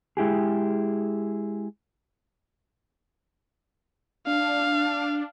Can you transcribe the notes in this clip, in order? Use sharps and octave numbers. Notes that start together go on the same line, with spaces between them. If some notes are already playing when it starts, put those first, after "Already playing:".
G#3 E4 G4 G#4
D4 F5